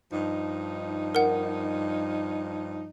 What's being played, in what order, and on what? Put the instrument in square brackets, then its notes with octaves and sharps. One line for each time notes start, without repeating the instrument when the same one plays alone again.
[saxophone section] G2 F3 D#4
[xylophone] A#4 F#5